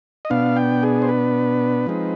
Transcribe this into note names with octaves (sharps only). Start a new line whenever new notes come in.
D#5
B2 B3 D4 F5
G5
G#4
C5
B4
F3 G#3 C4 D#4